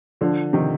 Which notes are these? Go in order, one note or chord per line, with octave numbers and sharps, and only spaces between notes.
D3 F3
C3 D#3